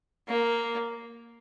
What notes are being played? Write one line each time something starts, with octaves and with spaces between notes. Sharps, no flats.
A#3